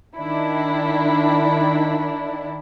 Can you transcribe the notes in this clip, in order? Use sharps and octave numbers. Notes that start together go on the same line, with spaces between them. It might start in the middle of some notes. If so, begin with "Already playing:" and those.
D#3 D4 E4